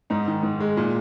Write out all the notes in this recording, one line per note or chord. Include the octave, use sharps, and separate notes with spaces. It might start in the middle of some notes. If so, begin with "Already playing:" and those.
G#2 D#4
D#3
G#2
G#3
A#2